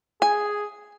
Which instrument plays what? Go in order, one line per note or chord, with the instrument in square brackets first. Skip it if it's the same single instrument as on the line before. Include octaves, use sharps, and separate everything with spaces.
[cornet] G#4 [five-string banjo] G#5